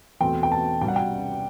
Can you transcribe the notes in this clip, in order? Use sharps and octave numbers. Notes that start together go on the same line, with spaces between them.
E2 B2 A3 C4 G5
G5
A5
C2 B2 G3 G5
F#5
G5